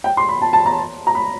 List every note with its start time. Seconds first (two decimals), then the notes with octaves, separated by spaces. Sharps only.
0.04 G5
0.17 C6
0.29 B5
0.42 A5
0.53 A5
0.66 A#5
1.07 A#5
1.15 B5